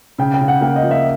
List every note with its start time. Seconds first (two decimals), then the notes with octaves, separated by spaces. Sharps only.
0.18 C#3 G5
0.34 G5
0.41 C#3
0.48 F#5
0.61 A#3 G5
0.76 D#5
0.83 F3
0.91 E5